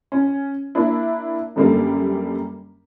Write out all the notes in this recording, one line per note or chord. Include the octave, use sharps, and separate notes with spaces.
C#4
A#3 D4 E4
F#2 D3 G3 A3 A#3